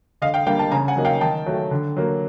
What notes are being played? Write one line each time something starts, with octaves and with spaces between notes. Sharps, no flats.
D3 D#5 F5
F5 G5
G3 A#3 D4 F5 G5
G5 A5
C#3 G#5 A#5
F#5 G#5
F#3 A#3 D#4
F5 G5
D#3 G5 A5
F#3 A3
D3
F#3 A#3